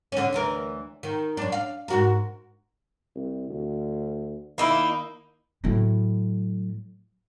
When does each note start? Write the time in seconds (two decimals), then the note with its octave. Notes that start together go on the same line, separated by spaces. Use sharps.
0.12 D3 C#4
0.33 D2 E3 A#4
1.03 D#3
1.37 F#2 D4
1.52 F5
1.88 G#2 F#4 A#4
3.15 C2
3.49 D2
4.58 D#3 A#3 D#4 E4
5.64 A2 F#3